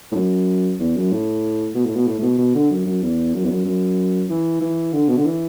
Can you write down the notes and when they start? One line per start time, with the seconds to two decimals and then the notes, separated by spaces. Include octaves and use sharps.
0.12 A2
0.15 F#2
0.79 E2
0.96 F#2
1.11 A2
1.75 B2
1.86 A2
1.96 B2
2.07 A2
2.19 A2
2.22 B2
2.38 B2
2.55 D3
2.71 F#2
2.86 F#2
3.02 E2
3.34 F#2
3.45 E2
3.50 F#2
3.65 F#2
4.30 E3
4.61 E3
4.93 D3
5.09 B2
5.17 D3
5.25 E3